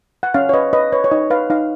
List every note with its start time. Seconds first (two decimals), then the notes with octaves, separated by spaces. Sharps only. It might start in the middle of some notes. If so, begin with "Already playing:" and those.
0.23 F#5
0.34 C#4 F5
0.49 C#5
0.54 B4 D#5
0.73 B4 D#5
0.92 B4 C#5
1.04 C#5
1.11 D#4 D#5
1.30 B4 F5
1.50 D#4 F5